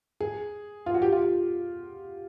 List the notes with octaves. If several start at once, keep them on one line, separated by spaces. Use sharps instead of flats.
G#4
F4
F#4
G4
F4